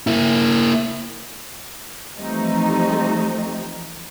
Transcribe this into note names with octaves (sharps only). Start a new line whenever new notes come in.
A#3 E4
E3 F3 G3 A3 C4 D#4